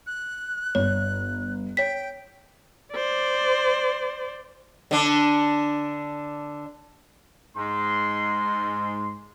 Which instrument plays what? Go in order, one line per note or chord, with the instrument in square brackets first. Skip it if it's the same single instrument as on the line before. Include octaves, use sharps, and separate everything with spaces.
[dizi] F#6
[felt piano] G1 [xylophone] C#5
[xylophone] C#5 B6 [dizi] G5
[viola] C5 D5
[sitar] D3 D4
[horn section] G#2 C6